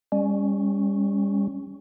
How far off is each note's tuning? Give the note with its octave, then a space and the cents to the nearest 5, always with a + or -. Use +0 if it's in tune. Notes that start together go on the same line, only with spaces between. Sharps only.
G3 +40 C#4 +0